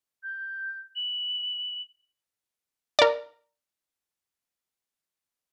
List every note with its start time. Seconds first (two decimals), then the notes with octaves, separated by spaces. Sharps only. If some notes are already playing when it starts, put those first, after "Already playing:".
0.23 G6
0.96 F#7
2.99 A#4 D5